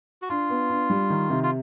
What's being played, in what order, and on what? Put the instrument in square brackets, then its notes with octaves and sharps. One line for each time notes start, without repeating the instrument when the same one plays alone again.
[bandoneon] F#4
[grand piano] D4 [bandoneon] F4
[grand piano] B3
D4
G3
D#3
C3
[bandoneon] F4